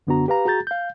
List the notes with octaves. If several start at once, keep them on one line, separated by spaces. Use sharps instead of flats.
F#2 D3 B3 D4 F#4 A#5
G4 B4 F5 A#5
F#4 G#4 A#5 G6 A6
F5 G6